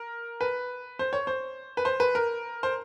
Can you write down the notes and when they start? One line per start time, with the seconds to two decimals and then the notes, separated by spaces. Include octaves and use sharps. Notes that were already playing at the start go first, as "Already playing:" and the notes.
Already playing: A#4
0.41 B4
0.99 C5
1.13 C#5
1.27 C5
1.77 B4
1.85 C5
2.00 B4
2.15 A#4
2.63 C5